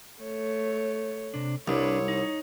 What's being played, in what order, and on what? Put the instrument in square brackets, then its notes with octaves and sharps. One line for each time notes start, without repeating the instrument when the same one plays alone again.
[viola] A3 C#5
[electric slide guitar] C3 D4
[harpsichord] C2 [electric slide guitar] G3 D4 B4 [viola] C#5
[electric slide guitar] D#4